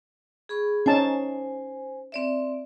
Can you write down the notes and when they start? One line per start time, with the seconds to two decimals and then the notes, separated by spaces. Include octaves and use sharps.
0.49 G#4 B5 C#6
0.86 C#4 D#4 C5 G#5 A5
2.12 C4 D5 E5